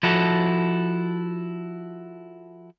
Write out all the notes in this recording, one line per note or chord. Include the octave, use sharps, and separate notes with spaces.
F3 E4 F#4 A4